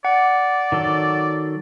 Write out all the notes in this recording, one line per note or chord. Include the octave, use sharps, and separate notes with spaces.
D5 F#5
D#3 F#3 A4